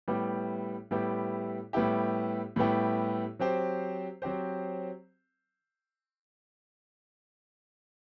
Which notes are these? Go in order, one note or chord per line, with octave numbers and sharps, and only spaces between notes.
A2 G3 B3 E4 G4
A2 G3 B3 E4 G4
A2 G3 B3 E4 G4
A2 G3 B3 E4 G4
F#3 C4 G4 C5
F#3 C4 G4 C5